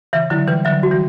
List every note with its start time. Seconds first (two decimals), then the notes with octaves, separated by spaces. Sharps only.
0.13 C#3 E3 E5
0.30 D3 F#3 E4
0.47 E3 G3 B4
0.65 D3 F#3 E5
0.83 F#4
0.91 E3 G3